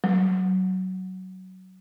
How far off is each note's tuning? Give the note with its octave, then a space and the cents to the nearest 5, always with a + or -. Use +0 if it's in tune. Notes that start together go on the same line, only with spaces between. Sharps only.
F#3 +15